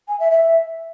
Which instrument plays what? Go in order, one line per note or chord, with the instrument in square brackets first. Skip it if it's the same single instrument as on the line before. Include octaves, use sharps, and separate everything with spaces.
[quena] G#5
E5
E5